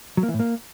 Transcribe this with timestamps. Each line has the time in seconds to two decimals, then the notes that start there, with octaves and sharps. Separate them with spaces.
0.17 F#3
0.23 A#3
0.28 E3
0.34 A2
0.40 A#3